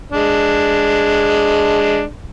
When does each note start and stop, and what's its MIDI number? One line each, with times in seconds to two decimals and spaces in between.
0.12 2.03 56
0.12 2.03 62